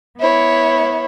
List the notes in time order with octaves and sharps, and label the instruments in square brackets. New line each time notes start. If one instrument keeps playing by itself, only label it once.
[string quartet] B3 E4 C#5